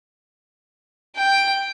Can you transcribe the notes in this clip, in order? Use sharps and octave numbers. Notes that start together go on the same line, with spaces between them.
G5